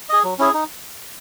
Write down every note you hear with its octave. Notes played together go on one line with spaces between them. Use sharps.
G#4 D#5
F#3
C#4 E4 G#4
D#4